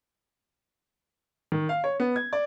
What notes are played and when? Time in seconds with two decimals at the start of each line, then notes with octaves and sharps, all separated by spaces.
1.52 D#3
1.69 F5
1.84 C#5
2.00 B3
2.16 G#6
2.33 D5